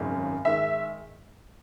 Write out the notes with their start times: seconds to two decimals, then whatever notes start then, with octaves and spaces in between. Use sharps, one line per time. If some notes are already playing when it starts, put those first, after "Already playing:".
Already playing: G#1 F#2 C#3 G#3 C#4
0.45 G#2 D#3 G#3 E5